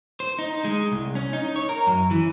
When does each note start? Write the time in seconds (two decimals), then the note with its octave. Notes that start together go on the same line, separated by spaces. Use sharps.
0.20 C5
0.39 D#4
0.65 G#3
0.92 C2
1.15 C#4
1.33 D#4
1.56 C#5
1.69 A#4
1.87 F#2
2.11 E3